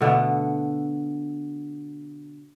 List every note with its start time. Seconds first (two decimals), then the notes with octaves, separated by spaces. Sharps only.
0.01 B2 D3 A3 B3